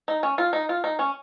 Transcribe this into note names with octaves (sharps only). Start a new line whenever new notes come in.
D#4
C#4
F4
D#4
F4
D#4
C#4